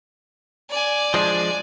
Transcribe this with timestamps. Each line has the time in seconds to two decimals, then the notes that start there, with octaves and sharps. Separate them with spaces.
0.70 D5 G#5
1.14 F3 G#3 D4